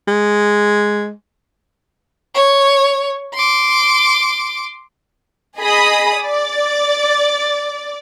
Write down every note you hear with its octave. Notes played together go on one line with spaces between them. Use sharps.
G#3
C#5
C6 D6
G#4 D#5 B5 D#6
D5